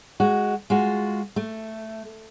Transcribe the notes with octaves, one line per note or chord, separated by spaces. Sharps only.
G#3 F#4
G#3 F4 F#4
A3